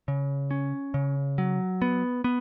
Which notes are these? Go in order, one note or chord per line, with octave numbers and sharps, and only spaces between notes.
C#3
C#4
C#3
F#3
B3
B3